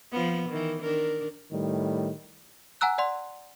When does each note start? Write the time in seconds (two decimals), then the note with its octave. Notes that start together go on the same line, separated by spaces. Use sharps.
0.13 F3 B3
0.49 D#3 E3
0.81 D#3 D4 A#4
1.51 A2 D#3 G3
2.81 F#5 G#5 A#5 E6 F#6
2.98 D5 F#5 C6